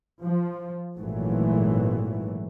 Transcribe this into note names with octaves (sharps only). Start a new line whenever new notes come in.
F3
G#1 A#2 E3 F#3 A3